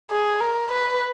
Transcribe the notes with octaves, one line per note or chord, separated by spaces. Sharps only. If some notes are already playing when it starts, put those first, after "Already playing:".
G#4
A#4
B4